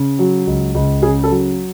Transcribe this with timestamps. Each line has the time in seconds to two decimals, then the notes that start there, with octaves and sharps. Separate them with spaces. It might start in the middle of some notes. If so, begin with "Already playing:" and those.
Already playing: C#3
0.19 F#3
0.47 C#2
0.75 C#2
1.02 C#3 G#4
1.24 A4
1.30 F#3